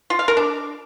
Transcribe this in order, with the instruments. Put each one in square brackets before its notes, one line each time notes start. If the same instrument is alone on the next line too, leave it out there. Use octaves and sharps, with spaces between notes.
[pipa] F4
F5
A#4
D4